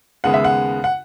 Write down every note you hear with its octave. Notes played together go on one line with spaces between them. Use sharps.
D#2 C#3 G#3 B3 F#5
E5
F#5
F#5